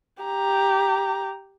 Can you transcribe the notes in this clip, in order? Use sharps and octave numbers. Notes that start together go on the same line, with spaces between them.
G4 A#5